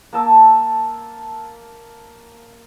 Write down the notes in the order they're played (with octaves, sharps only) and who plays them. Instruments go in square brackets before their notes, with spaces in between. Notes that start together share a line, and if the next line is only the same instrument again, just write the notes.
[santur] A#3 A5 E6